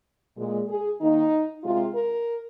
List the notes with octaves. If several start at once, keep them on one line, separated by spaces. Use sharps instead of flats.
A#2 G#3
G#4
D#3 A#3 D#4
C3 G#3 F4
A#4